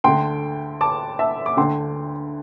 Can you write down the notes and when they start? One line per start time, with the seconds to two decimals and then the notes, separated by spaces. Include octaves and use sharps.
0.04 D2 D3 G5 C6
0.81 A5 D6
1.19 E5 A5
1.46 D6
1.57 D2 D3 G5 C6